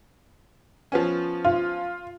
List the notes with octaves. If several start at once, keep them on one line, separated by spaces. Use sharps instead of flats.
F3 B3 C#4
F4